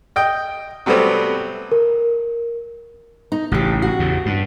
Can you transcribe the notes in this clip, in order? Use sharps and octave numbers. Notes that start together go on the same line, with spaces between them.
D#5 G5
C3 F#3 G3 A3 B3 C4
A#4
D#4
A1 C#3 F#4 G4
F#4
E2 C#3
G2